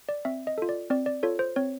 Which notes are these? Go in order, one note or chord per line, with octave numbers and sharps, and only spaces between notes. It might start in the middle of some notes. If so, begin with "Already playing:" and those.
D5
C4 E5
D#5
F4 A4
D5
C4 D5
D5
F4 A4 C#5
C5
C4 C#5